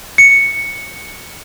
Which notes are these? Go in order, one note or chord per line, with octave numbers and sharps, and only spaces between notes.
C#7